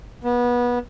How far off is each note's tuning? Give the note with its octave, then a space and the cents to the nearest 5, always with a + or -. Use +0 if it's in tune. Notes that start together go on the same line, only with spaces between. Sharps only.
B3 -25